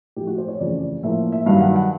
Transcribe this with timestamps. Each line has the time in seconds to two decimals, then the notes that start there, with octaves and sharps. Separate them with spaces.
0.16 A2 F3 A3 G4
0.27 F#4
0.38 C5
0.48 C#5
0.59 F2 C#3 E3 A3 D5
1.03 A2 F3 A#3 E5
1.32 E5
1.46 G2 D#3 F#3 F5
1.61 F#5
1.76 F#5